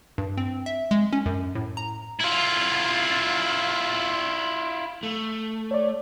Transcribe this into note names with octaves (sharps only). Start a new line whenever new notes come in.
G2
C4
E5
G#3
C#4
F#2
A2
A#5
E4 F4
A3
C#5 D5